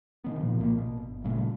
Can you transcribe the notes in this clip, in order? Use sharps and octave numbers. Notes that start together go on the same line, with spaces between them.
C3 D#3 B3
A#2 C#3 F3
B1 A#2 A#3
B2
G1
A#2 C#3 G3 A3